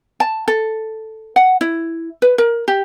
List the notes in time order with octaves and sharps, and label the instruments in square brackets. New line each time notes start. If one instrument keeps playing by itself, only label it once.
[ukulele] A5
A4
F#5
E4
B4
A#4
G4